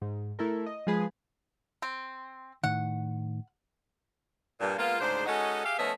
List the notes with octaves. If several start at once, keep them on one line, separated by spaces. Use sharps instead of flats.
G#2
A3 E4 A4 A#4
D#5
F3 G#3 G#4 B4
C4
A2 D#3 F#5
G2 A#2
G#3 A#3 B3 F4
D2 G#2 C#3 D4 C5
G#3 C#4 D#4 F#4 A4 D#5
G4 G#4 E5 F5
F3 A3 B3 C#4 D#5 E5